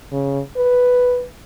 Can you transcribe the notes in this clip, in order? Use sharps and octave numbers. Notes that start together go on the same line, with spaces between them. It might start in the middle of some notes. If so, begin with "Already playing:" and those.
C#3
B4